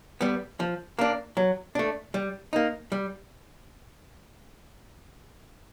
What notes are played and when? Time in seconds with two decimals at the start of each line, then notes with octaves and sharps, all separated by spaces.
0.21 G3 B3
0.60 F3
0.99 A#3 D4
1.37 F#3
1.75 A3 D4
2.14 G3
2.53 A#3 D#4
2.92 G3